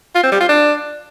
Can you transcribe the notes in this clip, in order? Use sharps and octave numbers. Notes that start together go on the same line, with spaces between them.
F4
C4
G3
F4
D4